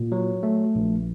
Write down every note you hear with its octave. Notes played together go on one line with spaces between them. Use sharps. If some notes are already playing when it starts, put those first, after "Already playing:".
Already playing: A#2
F#3
A3
A#1